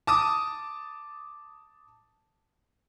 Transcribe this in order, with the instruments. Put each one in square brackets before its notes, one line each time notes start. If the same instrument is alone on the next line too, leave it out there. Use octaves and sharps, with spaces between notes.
[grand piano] A5 D6 D#6